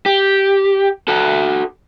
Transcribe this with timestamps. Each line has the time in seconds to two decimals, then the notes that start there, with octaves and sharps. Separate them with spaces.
0.06 G4
1.08 F#4 A4